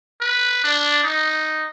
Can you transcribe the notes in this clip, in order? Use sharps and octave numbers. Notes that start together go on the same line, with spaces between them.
B4
D4
D#4